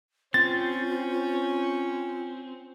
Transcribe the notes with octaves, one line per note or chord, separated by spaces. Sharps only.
C4 C#4 F4 A6